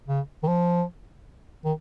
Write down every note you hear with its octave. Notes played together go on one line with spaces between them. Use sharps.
C#3
D#3
F3
D#3